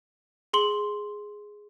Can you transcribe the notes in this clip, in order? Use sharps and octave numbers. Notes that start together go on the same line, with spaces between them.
G#4 C6 F#7